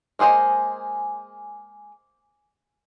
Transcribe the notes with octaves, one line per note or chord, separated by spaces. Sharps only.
G#3 A#3 G#4 C5 D#5